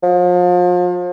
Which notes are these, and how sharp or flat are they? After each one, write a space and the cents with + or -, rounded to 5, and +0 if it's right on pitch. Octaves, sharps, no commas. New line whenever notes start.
F3 +35